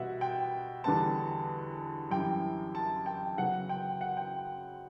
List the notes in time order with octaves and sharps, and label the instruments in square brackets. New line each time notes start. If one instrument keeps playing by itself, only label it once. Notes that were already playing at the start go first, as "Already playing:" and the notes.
Already playing: [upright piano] B2 G3 B3 E5 F#5
G5
E2 D3 G3 B3 A5
F#2 E3 G3 G5
A5
G5
C#3 F#3 B3 F#5
G5
F#5
G5